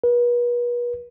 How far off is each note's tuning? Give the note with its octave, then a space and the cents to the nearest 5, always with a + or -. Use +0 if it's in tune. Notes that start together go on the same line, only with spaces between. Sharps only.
B4 -40